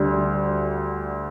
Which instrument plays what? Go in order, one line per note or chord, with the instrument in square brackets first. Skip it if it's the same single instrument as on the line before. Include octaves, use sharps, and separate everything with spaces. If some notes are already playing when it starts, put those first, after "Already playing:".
Already playing: [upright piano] D2 D3 G3